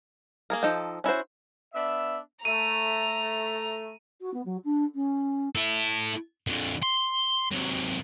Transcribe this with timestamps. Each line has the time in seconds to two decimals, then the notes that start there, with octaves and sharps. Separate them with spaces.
0.50 A#3 G#4 A#4
0.63 F3 D#4 A4 G5
1.04 C#4 E4 F#4 C5
1.74 B3 D4 E5
2.45 A3 A#5 D#7
4.21 F#4
4.33 B3
4.45 F#3
4.64 D4
4.94 C#4
5.55 E4 A4
6.47 F2 D3
6.83 C6
7.52 C3 F#3